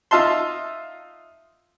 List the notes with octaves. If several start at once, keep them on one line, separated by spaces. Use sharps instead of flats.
D#4 F4 E5 A5 C6